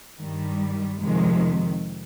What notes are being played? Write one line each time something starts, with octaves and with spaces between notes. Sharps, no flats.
G2 D#3 G3
F2 C3 D#3 G#3